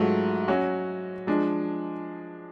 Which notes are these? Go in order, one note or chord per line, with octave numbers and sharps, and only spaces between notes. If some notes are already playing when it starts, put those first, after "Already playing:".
Already playing: G#2 F#3 A3 F4
F#3 C#4 F#4
F3 G#3 D4